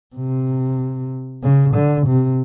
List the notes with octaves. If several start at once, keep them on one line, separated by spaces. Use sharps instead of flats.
C3
C#3
D3
C3